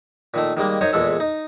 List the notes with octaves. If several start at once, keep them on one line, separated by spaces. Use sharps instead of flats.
A#2 D#3 A3
D#3 G3 G#3 A#3
F#2 D#4 C5 C#5 G#5
E2 A#2 G#3 A4
D#4